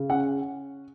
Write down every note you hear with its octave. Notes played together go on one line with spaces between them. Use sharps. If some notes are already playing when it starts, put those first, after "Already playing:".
Already playing: C#3
C#4 F#5